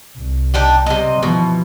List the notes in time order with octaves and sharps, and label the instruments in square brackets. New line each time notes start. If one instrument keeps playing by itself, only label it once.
[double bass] C2
[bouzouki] D4 D#4 G4
[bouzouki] C3 D#5 [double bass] G3
[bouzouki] B2 [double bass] E3 F3